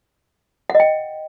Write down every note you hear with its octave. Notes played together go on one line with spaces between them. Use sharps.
F#5
D#5
G5